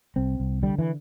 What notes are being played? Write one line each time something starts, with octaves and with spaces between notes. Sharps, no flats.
C2 C4
C2
D3 G3
E3